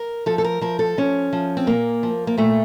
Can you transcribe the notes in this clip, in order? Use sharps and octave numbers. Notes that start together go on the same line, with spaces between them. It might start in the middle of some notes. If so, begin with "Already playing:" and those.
Already playing: A#4
F3 A4
A4
A#4
F3 A#4
A4
F3 C#4
F3
C4
A#2 A#3
F3
A#3
A#2 A3